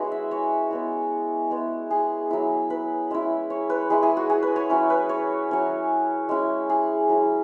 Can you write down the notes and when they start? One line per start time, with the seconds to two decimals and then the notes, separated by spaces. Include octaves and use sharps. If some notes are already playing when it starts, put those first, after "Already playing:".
Already playing: G#3 C#4 E4 F#4 G#4 B4 F#5
0.12 E5
0.31 C#5
0.71 G#3 B3 E4
1.50 G#3 B3 E4
1.91 G#4
2.30 F#3 E4
2.70 B4
3.11 G#3 C#4 E4
3.50 C#5
3.70 B4
3.90 G#3 E4 G#4
4.03 G#4
4.17 F#4
4.30 G#4
4.43 B4
4.56 C#5
4.70 F#3 C#4 E4
4.90 B4
5.09 C#5
5.49 F#3 C#4 E4
6.29 G#3 C#4 E4
6.70 G#4
7.09 F#3 E4